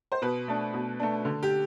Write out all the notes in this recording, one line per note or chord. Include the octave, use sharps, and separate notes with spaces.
C5
B2 B4
A3 D4
B2
A3 D4
D3
G4